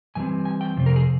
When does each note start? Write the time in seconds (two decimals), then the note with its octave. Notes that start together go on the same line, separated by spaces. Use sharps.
0.15 G2 E3 G3 C4 G#5
0.45 G#5
0.61 G5
0.77 F2 C3 C4
0.86 A#4
0.96 G#4